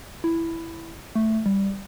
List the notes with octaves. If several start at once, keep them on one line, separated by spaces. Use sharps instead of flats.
E4
A3
G3